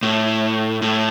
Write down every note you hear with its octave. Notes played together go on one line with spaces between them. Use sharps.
A2
A2